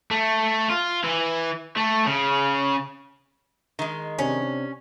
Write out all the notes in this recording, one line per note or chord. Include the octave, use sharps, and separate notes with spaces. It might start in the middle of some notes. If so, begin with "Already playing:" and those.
A3
F4
E3
A3
C#3
D#3 G#3
C3 C#4 D4